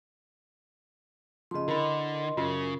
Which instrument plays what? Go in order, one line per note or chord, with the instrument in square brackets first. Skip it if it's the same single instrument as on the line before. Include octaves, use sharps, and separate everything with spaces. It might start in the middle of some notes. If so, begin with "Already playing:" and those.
[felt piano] C#3 F3 [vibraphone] D#5 C6
[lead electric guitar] D3 [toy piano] E4 B5 [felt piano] A#4
[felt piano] F#2 [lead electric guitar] C#3 [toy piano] F4 A#4 E6